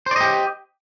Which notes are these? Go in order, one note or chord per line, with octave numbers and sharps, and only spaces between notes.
G4 C5 D5 D#5